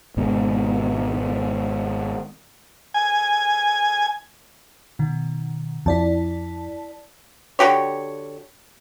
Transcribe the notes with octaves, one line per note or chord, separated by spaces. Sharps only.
G#1 B2 G#3
G#5
B2 D#3
F2 E4 D5 A5
D3 F#4 G4 C#5